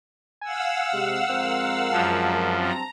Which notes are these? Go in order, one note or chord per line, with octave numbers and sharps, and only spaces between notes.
F5 F#5 G#5 E6
C3 G#3
F2 G#3 C4 A#4
F#2 F3 A5
G2 C4 A5 A#5